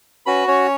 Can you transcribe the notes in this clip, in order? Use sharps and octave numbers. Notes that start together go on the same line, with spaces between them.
C#4 F#4 B4 B5
C#4 C#5